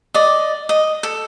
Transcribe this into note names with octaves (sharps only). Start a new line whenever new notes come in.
D5 D#5
D#5
A4